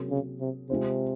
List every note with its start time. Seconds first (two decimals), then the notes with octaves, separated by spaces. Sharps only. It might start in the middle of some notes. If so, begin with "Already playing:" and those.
Already playing: C3 F#3 A#3 C#4 G#4
0.10 C#3
0.40 C3
0.70 C3 G#3 C4 F4 C5